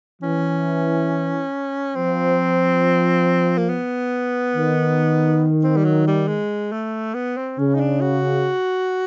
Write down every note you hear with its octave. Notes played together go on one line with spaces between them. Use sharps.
E3 C#4
F3 C4
A#3
B3
D#3
C4
G3
F#3
G3
G#3
A3
B3
C4
C#3 C#4
D#4
D4
F#4